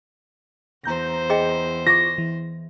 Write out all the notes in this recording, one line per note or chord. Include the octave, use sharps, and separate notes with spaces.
E2 C5 A#5 G6 A#6
G#4 D#5 G5
F4 C#6 D6 A#6
E3